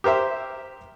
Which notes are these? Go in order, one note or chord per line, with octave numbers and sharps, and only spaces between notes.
G4 A#4 C5 E5